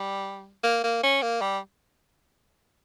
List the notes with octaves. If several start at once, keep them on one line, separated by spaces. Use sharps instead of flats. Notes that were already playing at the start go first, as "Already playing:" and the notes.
Already playing: G3
A#3
A#3
C#4
A#3
G3